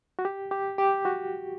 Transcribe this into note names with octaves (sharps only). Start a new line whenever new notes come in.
F#4
G4
G4
G4
F#4